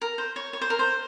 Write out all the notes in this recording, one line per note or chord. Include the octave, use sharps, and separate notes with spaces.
A#4
C5
C#5
C#5
C5
A#4
C5